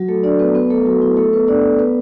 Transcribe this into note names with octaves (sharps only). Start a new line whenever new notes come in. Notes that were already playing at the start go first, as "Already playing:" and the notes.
Already playing: F#3 F#4
A3 A4
D4 D5
B3 B4
B3 B4
A3 A4
F#3 F#4
E4
A3 A4
B3 B4
D4 D5
B3 B4